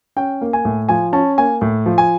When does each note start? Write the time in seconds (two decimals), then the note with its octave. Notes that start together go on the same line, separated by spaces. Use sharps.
0.16 C#4 G5
0.41 A#3
0.53 G#5
0.65 A2
0.89 F3 G#5
1.13 C#4 A5
1.38 A#3 G#5
1.61 A2
1.86 F3
1.98 G#5